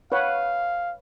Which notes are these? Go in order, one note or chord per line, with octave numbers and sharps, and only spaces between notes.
B4 C#5 F5 F#5